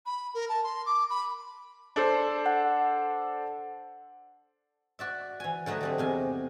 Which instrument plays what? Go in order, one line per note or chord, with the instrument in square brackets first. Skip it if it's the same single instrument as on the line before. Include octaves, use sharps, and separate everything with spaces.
[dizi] B5
A#4
A5
C6
D6
B5
[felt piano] D4 A4 C5
[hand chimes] F#5
[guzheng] F#4 D5 E5
E3 G#5
D3 F#3 A3 B4 D#5
F#3 G3 C4
E2 C3 G#5